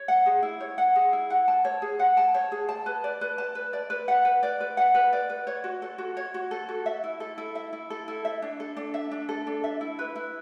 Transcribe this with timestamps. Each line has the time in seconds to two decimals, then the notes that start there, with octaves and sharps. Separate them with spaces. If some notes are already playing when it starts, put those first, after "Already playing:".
Already playing: C#5
0.08 F#5
0.26 G#4
0.43 E4
0.61 C#5
0.78 F#5
0.95 G#4
1.13 E4
1.30 F#5
1.48 A5
1.65 C#5
1.82 G#4
1.99 F#5
2.17 A5
2.34 C#5
2.52 G#4
2.69 A5
2.86 B4
3.04 D5
3.21 B4
3.38 A5
3.55 B4
3.73 D5
3.90 B4
4.08 F#5
4.25 B4
4.43 D5
4.60 B4
4.77 F#5
4.95 B4
5.13 D5
5.30 B4
5.47 C#5
5.64 F#4
5.82 A4
5.98 F#4
6.17 C#5
6.34 F#4
6.51 A4
6.69 F#4
6.86 E5
7.04 E4
7.20 A4
7.38 E4
7.55 E5
7.73 E4
7.90 A4
8.08 E4
8.25 E5
8.42 D4
8.60 A4
8.77 D4
8.94 E5
9.11 D4
9.29 A4
9.47 D4
9.64 E5
9.81 E4
9.99 B4
10.16 E4